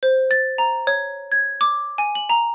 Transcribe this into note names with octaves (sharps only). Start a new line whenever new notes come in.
C5
A6
A#5
C#5
G#6
D6
G#5
F#7
A#5